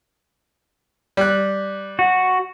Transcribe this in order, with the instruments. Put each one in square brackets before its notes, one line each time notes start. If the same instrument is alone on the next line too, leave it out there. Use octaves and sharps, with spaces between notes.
[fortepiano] G3 F#6
[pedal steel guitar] F#4